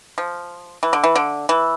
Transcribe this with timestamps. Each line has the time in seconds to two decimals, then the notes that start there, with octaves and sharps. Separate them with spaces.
0.18 F3
0.83 E3
0.93 D3
1.04 E3
1.16 D3
1.49 E3